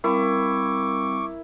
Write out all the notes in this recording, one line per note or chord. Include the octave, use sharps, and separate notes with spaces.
G3 C4 E4 A#4 F5 C#6 D6